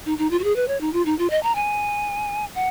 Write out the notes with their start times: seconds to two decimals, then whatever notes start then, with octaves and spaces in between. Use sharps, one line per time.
0.06 D#4
0.18 D#4
0.31 F4
0.39 F#4
0.44 G#4
0.56 B4
0.68 C#5
0.81 D#4
0.93 F4
1.06 D#4
1.19 F4
1.30 D#5
1.43 A#5
1.55 G#5
2.55 F#5